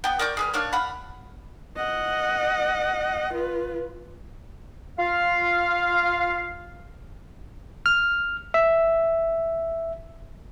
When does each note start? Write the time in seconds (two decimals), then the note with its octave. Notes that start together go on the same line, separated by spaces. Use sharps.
0.04 B3 G5
0.19 A#4 D5 C#6 G6
0.37 G#4 B4 F6
0.54 A#3 D4 C#5 F6
0.73 F5 F#5 B5
1.76 D#5 F#5
3.33 F4 B4
4.99 F4 F5
7.86 F6
8.54 E5